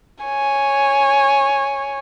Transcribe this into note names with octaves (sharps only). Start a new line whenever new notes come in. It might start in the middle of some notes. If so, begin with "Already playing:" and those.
C#5 G#5